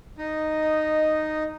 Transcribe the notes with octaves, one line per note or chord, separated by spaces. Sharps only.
D#4 D#5